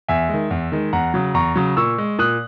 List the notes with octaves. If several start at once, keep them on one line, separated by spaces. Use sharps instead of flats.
E2 E5 G#5
D#3 G#3
E2
D#3 G#3
E2 F#5 A#5
C#3 F#3
E2 A#5 C#6
C#3 F#3
A#2 C#6 E6
G#3
A#2 D#6 F#6